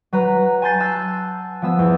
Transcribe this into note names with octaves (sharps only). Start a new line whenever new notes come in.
F#3 B4 A#5 F#6
G#5 A5 C6 G6 A6 C7
A5 E6 F#6
F3 B3 E6
E2